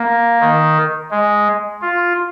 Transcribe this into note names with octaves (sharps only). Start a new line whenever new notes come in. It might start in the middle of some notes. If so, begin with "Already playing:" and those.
Already playing: A#3
D#3
G#3
F4